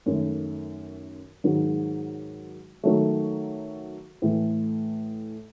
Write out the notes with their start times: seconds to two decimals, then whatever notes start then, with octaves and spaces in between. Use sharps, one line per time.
0.06 F#2 D#3 A3
1.44 G#2 D#3 F#3
2.84 D#3 F#3 A3
4.22 A2 E3 A3